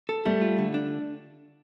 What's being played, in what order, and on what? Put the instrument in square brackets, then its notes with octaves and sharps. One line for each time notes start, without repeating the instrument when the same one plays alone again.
[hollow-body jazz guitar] A4
[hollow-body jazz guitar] G3 [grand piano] A3
[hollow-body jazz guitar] F4
D3
D4